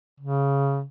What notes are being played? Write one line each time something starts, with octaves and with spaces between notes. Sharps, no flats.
C#3